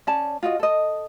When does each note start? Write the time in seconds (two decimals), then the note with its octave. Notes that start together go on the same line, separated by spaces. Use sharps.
0.07 C#4 D5 A5
0.43 F4 F#4 D#5
0.59 A4 D#5